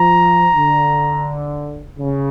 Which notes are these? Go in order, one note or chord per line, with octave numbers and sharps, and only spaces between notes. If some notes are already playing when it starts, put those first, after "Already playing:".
Already playing: F3 A#5
D3
C#3